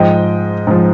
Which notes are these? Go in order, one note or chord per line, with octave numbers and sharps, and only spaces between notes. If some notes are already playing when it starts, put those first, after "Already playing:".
Already playing: G#2 F3 D#5 G5
G#2 F3